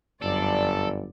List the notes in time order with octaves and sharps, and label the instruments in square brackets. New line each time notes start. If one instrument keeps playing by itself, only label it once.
[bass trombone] G1 [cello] F#2 [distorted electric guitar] A4 [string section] D5